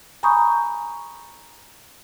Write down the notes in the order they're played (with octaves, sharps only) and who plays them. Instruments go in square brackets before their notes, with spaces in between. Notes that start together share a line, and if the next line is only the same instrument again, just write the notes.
[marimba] G#5 A#5 B5 C#6 D#6 G6